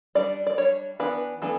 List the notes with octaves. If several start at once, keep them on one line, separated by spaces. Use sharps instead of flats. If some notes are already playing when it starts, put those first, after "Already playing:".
G3 D4 D5
D5
G3 D4 C#5
E3 B3 D4 B4
E3 B3 D4 A4